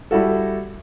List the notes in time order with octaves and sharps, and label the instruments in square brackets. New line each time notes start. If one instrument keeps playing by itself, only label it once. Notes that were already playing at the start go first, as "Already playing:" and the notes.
[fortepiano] G3 E4 F#4 A4